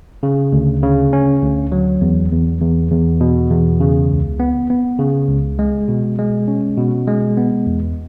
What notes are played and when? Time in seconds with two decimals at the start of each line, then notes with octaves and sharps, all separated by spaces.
0.23 C#3
0.52 D2
0.83 C#3
1.13 C#4
1.42 D2
1.72 F#3
2.01 E2
2.32 E2
2.61 E2
2.91 E2
3.21 B2
3.50 E2
3.80 C#3
4.10 C#2
4.40 B3
4.70 B3
4.99 C#3
5.29 C#2
5.59 G#3
5.88 B2
6.18 G#3
6.48 C#4
6.77 B2
7.08 G#3
7.37 B3
7.67 E2